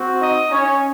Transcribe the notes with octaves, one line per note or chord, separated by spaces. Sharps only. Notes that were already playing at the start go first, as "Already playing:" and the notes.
Already playing: C4 F#4
D#4 D#5
C#4 C#5